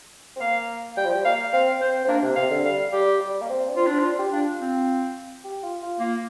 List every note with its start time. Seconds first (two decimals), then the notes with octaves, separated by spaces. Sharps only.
0.36 C4
0.41 A#3 F5
0.97 G3 G5
1.05 F3
1.14 G3
1.25 A#3 F5
1.53 C4 F5
1.81 C4 C5
2.04 C4
2.08 A#3 D4
2.22 C3
2.36 C3 F5
2.51 D3
2.64 G3 F5
2.92 G3 G4
3.20 G3
3.42 A#3
3.49 C4
3.69 D4
3.76 C4 F4
3.87 D4
3.93 C4
3.99 D4 F4
4.19 G4
4.32 D4 F4
4.61 C4
5.44 G4
5.63 F4
5.82 F4
5.99 A#3 F4